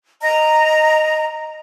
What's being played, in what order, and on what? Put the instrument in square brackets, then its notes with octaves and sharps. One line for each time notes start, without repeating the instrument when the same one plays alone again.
[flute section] D#5 A#5